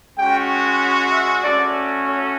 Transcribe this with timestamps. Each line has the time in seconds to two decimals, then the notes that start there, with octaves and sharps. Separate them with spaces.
0.18 G#3 C#4 F#4 G5
1.12 E5
1.44 A3 C#4 F#4 D5
2.07 C#5